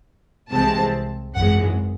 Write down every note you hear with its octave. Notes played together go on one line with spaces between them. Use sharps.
C2 C3 E3 G#3 C4 A5
G#1 F#2 E3 G#3 F#5